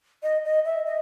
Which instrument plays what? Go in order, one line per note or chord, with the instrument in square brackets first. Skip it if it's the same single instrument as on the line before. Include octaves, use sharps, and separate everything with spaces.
[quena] D#5
D#5
E5
D#5